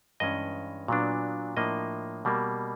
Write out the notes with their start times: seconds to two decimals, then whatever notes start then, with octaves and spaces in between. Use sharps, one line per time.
0.20 G2 E3 G#3 C#4 D#5
0.88 A#2 F#3 B3 D4
1.57 A2 F3 A#3 D4 D#5
2.25 B2 G3 A#3